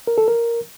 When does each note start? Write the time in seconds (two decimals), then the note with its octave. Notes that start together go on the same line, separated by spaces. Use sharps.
0.07 A#4
0.18 A4
0.28 A#4